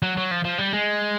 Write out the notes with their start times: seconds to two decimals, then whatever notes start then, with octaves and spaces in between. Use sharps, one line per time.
0.02 F#3
0.17 F#3
0.31 F3
0.44 F3
0.58 G3
0.73 G#3